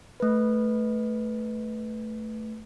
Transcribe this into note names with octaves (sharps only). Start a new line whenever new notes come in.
A3 B4